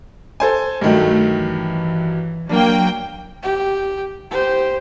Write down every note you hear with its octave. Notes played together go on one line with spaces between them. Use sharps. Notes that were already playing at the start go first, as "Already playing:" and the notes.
A4 C5 G#5
G2 D#3 F#3 A3
E3
F#3 A#3 D4 G5
G4
G4 C5